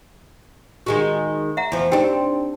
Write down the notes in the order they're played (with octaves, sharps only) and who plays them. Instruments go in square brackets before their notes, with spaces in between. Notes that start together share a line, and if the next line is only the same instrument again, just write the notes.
[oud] D#3 G#3 F#4
[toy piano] E5 F#5 A#5
[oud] E2 F3
[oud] C4 D4 [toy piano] D#4 G4 G5